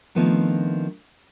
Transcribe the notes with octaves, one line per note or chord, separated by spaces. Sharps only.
D#3 F3 A3 B3 C4 D4